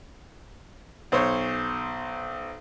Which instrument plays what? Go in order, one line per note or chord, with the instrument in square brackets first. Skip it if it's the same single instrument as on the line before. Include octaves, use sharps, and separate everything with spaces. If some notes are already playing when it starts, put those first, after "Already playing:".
[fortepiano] B1 C5 C#5